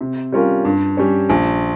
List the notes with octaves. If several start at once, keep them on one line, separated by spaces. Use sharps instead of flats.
C3
G3 C#4 F4 A#4
G2
G3 C#4
A#1